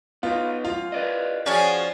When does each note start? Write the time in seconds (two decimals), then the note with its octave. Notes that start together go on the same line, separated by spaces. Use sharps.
0.23 B3 D4 D#4 F4
0.65 F#2 F4 F5
0.92 B4 D5 D#5
1.46 F3 C#4 F#4 G#4 D5 G#5